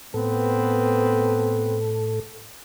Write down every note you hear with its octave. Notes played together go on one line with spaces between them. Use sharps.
A2 B3 C4 A4 B4